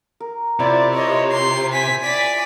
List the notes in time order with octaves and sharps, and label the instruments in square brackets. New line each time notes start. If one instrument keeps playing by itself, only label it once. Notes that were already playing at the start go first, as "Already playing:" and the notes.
[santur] A#4
[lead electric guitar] C3 [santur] E4 F4 [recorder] D5
[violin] C#5 [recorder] D#5
[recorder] C6 [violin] C7
[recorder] G#5 [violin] B6
[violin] D5 B6